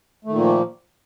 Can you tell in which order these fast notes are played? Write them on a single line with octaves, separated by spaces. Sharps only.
A3 D#3 A#2 A#3 F3